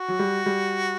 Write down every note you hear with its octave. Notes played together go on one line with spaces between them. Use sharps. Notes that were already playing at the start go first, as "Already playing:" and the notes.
Already playing: F#4
F#3
G3
G3